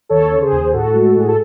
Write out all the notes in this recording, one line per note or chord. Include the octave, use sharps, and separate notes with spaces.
D#2 A4 C#5
C#3
G#4 C5
D#2
A2 F#4 A4
G#3
A2 G#4
A4